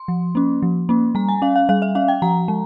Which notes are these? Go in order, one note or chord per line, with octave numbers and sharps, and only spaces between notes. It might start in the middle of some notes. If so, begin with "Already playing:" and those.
Already playing: C6
F3
A#3 C#4
F3
A#3 C#4
G3 A#5
G#5
C#4 F5
F5
G3 F5
E5
C#4 F5
G5
F3 A#5
G#3